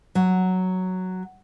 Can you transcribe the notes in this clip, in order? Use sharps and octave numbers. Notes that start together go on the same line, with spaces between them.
F#3